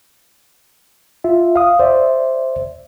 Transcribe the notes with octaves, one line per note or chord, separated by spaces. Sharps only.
F4 E5
F5 D#6
C5 D5 E5